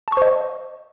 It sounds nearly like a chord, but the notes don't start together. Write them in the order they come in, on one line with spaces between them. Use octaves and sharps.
A5 C#6 C5 D#5